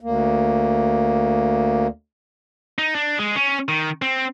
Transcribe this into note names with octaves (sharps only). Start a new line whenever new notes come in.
D2 A#3
D#4
D4
G#3
C#4
D#3
C4